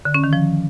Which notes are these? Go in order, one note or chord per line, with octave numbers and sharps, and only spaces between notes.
D3
C#4
D#3
F3